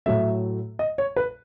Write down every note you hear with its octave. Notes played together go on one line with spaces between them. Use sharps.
A2 F#3 A3 E5
D#5
C#5
B4